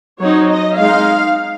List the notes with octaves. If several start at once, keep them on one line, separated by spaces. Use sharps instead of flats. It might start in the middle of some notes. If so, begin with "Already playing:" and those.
F#3 C4 D#4 C#5
D#5
G#3 D#4 F5